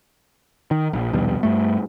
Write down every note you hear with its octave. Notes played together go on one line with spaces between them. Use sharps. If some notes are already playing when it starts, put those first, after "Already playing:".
D#3
A#1
A#1 D#2 B2 G3
G2 A3